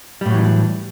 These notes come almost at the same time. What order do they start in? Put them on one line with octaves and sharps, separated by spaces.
G3 A2 F#3 E3 D4